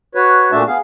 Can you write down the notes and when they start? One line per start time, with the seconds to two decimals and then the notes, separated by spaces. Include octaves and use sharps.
0.15 F#4 B4 C#5
0.52 A#2 A3 D4 F#4 E5 A5
0.67 B3 G#4 F5